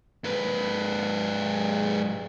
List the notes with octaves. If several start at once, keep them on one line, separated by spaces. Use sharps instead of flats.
G#2 B4